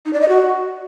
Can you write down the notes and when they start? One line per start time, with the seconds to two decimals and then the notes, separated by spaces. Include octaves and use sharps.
0.05 D#4
0.13 D5
0.21 D#5
0.28 F#4